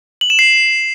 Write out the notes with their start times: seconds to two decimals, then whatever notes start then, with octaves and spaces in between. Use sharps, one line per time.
0.21 F#7
0.30 E7
0.39 C7